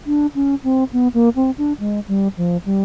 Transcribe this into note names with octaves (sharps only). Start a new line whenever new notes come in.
D4
C#4
C4
B3
A#3
C4
D4
G#3
G3
F3
G3